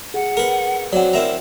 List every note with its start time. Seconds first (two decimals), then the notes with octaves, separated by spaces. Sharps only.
0.14 G#4 F#5
0.37 A#4 B4
0.93 F#3 C4 D5 F#5
1.13 C4 E4 A#4 A#5